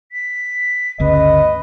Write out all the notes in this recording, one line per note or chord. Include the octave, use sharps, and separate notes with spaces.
B6
G1 D2 C#3 B4 D#5